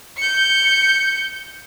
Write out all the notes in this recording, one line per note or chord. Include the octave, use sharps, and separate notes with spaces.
G6 C#7